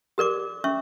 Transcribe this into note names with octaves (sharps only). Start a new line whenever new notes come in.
G4 A#4 D5 D6
C#4 E5 C#6